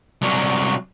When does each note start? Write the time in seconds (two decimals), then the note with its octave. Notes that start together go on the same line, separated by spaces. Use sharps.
0.22 C2 F#3